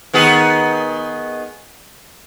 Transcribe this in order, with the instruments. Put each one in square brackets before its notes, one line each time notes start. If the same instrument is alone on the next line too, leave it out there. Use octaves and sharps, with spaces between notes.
[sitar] D#3 B3 G#4